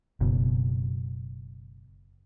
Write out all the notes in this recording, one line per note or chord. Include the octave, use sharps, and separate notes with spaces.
F#1 B2